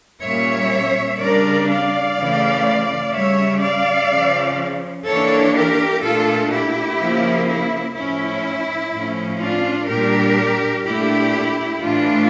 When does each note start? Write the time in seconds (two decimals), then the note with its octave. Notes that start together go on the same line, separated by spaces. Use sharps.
0.23 A#2 G3 C#4 C#5 E5
1.20 C#3 G3 D4 A#4 D5
1.69 D5 F5
2.17 C#3 E3 A3
3.13 C#3 G3 C#4 C#5 E5
3.61 D5 F5
4.10 C#3 F3 C#4
5.06 E3 A#3 D4 A4 C#5
5.54 G4 A#4
6.03 A#2 A3 D4 F4 A4
6.51 E4 G4
6.99 C#3 F3 A#3 C#4
7.48 E4
7.95 A2 F3 C#4 E4
8.93 A2 F3 C#4
9.41 D4 F4
9.89 A#2 G3 D4 G4 A#4
10.85 A#2 A3 D4 E4 G4
11.82 A2 E3 A3 D4 F4